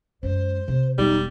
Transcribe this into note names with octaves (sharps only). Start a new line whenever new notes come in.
F#2 G#3 C5
C3
E1 G3 D#4